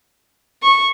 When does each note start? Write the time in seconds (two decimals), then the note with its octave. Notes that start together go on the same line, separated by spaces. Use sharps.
0.63 C#6